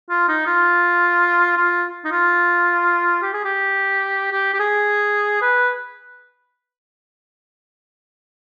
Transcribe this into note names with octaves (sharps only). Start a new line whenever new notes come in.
F4
D#4
F4
F4
D#4
F4
G4
G#4
G4
G4
G4
G#4
B4